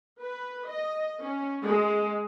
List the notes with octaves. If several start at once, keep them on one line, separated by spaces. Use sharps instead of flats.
B4
D#5
C#4
G#3